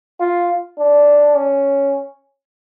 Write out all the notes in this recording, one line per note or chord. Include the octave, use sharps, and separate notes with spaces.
F4
D4
C#4